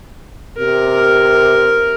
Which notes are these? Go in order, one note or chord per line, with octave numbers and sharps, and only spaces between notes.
C3 A#4